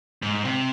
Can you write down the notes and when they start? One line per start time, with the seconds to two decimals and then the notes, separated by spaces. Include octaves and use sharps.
0.22 G#2
0.44 C3